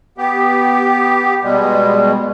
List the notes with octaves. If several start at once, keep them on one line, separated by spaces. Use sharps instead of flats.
B3 G4
B2 G3 G#3